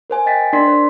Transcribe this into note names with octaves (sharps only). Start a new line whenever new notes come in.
A#4 C5 G#5
D#5 G5 A6 B6
D4 A#4 D5 C6 B6 C7
C5